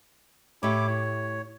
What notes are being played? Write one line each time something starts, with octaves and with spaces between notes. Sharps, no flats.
A2 E4 G4 C#5 D6
C#5